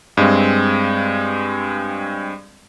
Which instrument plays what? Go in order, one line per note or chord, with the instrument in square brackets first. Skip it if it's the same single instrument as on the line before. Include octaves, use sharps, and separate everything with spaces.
[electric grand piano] G2 G#3 C4